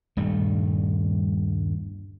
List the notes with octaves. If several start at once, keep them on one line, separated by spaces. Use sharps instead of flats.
D#1 G2 G3 A3